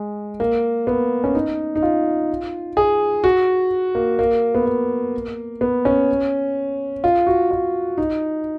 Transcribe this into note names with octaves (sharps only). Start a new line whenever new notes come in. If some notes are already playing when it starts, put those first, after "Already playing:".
Already playing: G#3
A#3
B3
C#4
D#4
D#4
F4
G#4
F#4
A#3
A#3
B3
A#3
B3
C#4
F4
F#4
F4
D#4